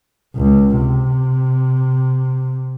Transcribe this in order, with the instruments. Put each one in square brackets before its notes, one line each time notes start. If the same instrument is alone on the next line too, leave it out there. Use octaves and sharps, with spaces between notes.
[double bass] C#2
C3